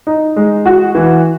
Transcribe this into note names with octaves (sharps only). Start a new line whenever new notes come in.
D#4
G#3
F#4
E3